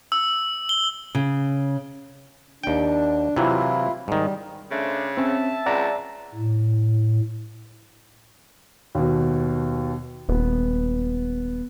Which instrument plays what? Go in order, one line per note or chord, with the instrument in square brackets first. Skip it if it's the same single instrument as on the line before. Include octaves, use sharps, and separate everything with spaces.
[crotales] E6
G7
[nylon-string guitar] C#3
[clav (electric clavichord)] D#2 G5 [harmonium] D4
[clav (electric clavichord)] C3 E3 F#3 [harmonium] E4 F4
[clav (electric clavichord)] G#2 D#3 [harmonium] G3
[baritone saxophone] C#3 [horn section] A3 D4 C5
[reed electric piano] C4 C#4 [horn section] E5 A5
[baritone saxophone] C#2 [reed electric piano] D5 F#5 A#5
[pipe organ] A2
[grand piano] D#2 B2
[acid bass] D#1 [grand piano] B3